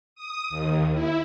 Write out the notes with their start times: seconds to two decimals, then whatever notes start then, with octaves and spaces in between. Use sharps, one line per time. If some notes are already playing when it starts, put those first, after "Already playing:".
0.15 D#6
0.50 D#2
0.93 E4